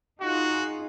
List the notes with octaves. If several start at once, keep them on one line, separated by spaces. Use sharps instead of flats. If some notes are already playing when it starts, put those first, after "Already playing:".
D#4 F4 F#4 G#4